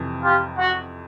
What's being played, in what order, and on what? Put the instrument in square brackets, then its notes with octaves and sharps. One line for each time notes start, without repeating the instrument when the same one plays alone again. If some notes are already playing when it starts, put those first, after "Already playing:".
Already playing: [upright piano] F2 C3 E3
[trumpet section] F4 G4
F#4